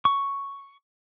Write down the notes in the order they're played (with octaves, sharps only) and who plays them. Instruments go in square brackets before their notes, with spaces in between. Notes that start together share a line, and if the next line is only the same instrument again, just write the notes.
[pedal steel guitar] C#6